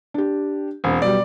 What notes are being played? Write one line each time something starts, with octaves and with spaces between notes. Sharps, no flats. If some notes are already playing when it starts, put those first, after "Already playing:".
D4 G4
E1 C4
B2 F#3 G3 D5